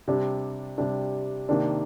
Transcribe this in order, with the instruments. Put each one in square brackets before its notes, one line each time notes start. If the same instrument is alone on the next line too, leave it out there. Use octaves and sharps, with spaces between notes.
[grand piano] C3 G3 D4
C3 G3 D4
C3 D#3 A#3 D4